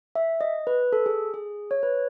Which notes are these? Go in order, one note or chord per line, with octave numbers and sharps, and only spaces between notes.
E5
D#5
B4
A4
G#4
G#4
C#5
B4